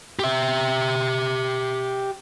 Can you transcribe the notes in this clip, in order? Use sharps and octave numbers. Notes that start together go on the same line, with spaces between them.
G4 E5